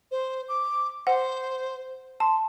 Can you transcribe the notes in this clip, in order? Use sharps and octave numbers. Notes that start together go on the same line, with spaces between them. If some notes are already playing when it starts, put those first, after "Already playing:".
C5
D6
C5 F#5
A5 C6